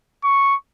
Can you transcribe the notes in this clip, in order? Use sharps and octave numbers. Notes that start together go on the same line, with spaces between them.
C#6